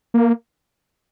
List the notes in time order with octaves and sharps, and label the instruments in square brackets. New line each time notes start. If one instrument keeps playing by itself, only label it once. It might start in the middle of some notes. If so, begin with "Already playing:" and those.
[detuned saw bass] A#3